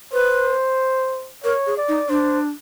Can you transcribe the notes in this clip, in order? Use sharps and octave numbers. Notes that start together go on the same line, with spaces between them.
B4 C5
A#4 C#5
G#4
D5
D#4
D4 C5